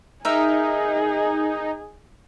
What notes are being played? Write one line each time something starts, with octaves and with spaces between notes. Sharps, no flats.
D#4 G#4 A#4 E5